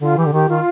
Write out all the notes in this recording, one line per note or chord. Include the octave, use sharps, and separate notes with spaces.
D3 F4
E3 G4
D3
D#3 G4
D#3 F4